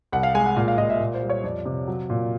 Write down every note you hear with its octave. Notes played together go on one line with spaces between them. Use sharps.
C2 F#5
F5
G#3 G#5
F#5
A#2 F5
F5
A#2 D#5
E5
A#2
C5
G3
C#5
F2 D5
C3
F#3
A#2